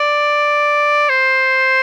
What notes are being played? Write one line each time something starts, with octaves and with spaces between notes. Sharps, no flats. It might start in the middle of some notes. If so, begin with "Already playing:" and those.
Already playing: D5
C5